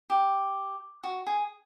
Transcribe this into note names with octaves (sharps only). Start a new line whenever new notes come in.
G4
F#4
G#4